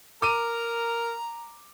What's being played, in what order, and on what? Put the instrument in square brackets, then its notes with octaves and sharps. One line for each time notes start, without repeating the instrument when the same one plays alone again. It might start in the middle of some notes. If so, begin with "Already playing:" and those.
[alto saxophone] A#4 [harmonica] A#5 [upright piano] D6 D#7